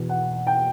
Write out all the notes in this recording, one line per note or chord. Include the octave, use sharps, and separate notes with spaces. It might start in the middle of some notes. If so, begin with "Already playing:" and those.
Already playing: E2 B2
F#5
G5